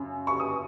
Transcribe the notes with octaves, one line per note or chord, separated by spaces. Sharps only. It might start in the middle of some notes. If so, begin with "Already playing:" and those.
Already playing: F#2 C#3
C#6
D#6